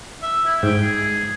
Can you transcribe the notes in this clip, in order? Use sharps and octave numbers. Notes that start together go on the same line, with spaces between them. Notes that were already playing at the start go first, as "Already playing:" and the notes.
E5
E4
G#2 G5
G#4